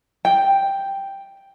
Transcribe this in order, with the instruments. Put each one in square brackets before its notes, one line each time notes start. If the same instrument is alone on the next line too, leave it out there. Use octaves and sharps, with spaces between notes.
[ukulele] G5